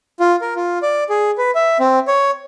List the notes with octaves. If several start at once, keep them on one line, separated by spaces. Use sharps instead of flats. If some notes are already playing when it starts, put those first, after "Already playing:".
F4
A#4
F4
D5
G#4
B4
E5
C4
C#5